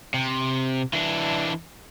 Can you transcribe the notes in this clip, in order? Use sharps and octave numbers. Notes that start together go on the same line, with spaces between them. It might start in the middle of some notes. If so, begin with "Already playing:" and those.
C3
E3 D4